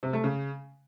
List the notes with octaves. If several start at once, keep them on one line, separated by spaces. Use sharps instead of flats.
C3
A3
C#3